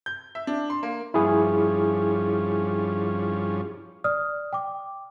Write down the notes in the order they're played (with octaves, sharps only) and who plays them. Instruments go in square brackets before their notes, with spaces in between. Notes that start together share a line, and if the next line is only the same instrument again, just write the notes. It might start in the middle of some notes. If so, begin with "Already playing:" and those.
[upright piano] G6
E5
D4
C6
A#3
[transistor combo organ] G2 F3 C#4 [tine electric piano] E4 G#4
[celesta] D5 D#6 F6
G5 D6